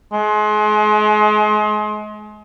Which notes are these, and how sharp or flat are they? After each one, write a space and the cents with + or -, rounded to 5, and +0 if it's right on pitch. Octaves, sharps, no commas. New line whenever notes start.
G#3 +35